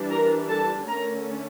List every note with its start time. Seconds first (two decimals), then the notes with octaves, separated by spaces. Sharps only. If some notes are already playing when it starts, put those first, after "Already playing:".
Already playing: E3 G3 D4
0.11 A#4 A#5
0.49 A4 A5
0.87 D3 A3 C#4 A#4 A#5